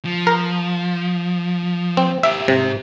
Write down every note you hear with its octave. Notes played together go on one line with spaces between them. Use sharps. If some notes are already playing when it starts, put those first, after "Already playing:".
F3
A#4
C4
G4 A#4 E5
G#2 C3 C5